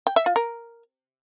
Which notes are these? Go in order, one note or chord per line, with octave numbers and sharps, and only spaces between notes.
G5
E5
F4
A#4